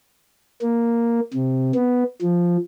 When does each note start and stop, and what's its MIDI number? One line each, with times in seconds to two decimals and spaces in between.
0.62 1.20 58
1.34 1.72 48
1.75 2.04 59
2.22 2.57 53